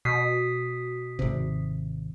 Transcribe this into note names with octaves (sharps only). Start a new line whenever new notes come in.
B2 D#6 B6 C7
G#1 C3